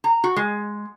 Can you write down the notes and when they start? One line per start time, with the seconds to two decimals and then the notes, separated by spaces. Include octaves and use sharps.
0.04 A#5
0.24 F#4
0.36 G#3